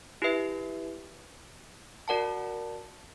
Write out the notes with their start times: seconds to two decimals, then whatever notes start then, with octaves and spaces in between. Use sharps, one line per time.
0.22 E4 G4 B4 E5
2.08 F#4 A#4 D5 F#5 A5